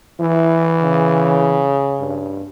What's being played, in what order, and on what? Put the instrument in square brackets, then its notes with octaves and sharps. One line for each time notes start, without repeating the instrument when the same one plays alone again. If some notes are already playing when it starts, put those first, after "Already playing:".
[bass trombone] E3 [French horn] E4
[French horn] C#3
[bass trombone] G2